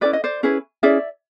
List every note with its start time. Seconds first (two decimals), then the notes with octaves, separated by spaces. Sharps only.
0.01 C#4 E4 G#4 B4 D5
0.13 D#5
0.24 C5 D5
0.43 C#4 E4 G#4 B4
0.83 C#4 E4 G#4 D5 E5